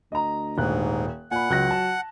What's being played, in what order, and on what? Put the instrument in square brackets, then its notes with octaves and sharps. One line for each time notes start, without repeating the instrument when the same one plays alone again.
[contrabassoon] D2 [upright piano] D#5 A#5
[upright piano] D#1 F#6 [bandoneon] G#2
[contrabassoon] A#2 [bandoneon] F#5 [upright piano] G#5 B5
[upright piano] C#2 F#6 A#6 [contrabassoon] F#3
[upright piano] A5